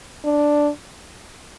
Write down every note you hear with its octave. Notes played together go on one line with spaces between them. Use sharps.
D4